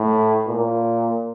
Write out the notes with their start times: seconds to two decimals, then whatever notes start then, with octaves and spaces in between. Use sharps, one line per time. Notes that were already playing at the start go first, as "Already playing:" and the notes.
Already playing: A2
0.48 A#2